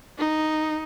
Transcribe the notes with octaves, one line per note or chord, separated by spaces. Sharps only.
D#4